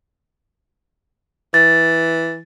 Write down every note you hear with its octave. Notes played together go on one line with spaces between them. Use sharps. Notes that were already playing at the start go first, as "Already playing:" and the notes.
E3 A6